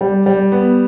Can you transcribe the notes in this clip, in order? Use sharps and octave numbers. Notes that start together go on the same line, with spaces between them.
G3
G3
B3